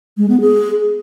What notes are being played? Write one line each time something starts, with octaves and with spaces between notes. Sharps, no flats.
G#3
B3
G#4